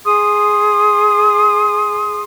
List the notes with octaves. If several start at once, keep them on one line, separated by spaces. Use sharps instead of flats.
G#4 C6 D#6